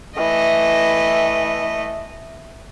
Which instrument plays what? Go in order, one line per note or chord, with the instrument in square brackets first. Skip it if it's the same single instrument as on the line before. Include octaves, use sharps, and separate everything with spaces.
[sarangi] E3 [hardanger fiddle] A3 D#5